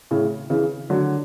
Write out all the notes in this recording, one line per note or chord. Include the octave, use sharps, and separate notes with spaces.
A2 C#3
C#3 E3
D3 F#3